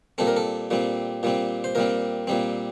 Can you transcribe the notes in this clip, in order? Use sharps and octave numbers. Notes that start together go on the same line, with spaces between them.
A#2 G3 C4 A4
A#4
A4
A#2 G3 C4
A#2 G3 C4
C5
A#2 G3 C4 A#4
A#2 G3 C4